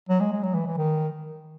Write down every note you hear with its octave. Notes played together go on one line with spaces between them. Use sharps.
F#3
G#3
G#3
F#3
E3
E3
D#3